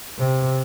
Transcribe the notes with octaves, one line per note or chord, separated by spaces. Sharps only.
C3